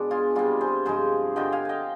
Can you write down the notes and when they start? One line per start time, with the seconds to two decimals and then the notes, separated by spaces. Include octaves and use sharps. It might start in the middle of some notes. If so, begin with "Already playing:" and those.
Already playing: B2 G#3 D4
0.11 F4 G#4
0.35 C3 G3 F4 G#4
0.61 G#4 C5
0.86 G2 F3 G#3 G#4 C5
1.36 G2 D3 F3 D#5 G5
1.52 F5 G#5
1.65 D#5 G5 G#5